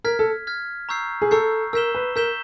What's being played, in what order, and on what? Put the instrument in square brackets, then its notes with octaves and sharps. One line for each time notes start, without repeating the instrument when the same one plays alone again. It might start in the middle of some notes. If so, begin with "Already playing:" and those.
[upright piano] A#4 [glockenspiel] F6 G#6 B6
[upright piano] A4
[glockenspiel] F6 G#6 B6
A#5 C#6 E6 G6 C7
[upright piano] G#4
[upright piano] A4 [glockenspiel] A#5 C#6 E6 G6 C7
[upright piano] A#4 [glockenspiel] E6 G6 B6 E7 G7
[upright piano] B4
[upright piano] A#4 [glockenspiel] E6 G6 B6 E7 G7